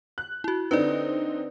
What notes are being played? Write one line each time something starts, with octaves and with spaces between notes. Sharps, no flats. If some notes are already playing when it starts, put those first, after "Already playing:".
F#6
E4 F#4
D3 C4 D#4 B4 D5